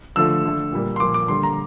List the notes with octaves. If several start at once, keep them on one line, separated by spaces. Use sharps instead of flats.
D3 F3 A3 E6
D3 A3
A#2 G3 A#3
C6
A#2 F3 A#3 D6
D6
D3 G3 A#3 C6
A#5